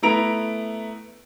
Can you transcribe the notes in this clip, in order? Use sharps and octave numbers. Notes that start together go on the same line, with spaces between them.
A3 B3 E4 A#5 D7 F7